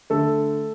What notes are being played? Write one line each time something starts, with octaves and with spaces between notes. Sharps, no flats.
D3 A3 A4